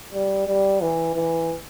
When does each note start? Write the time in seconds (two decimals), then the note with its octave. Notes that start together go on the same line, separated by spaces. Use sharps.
0.13 G3
0.47 G3
0.82 E3
1.15 E3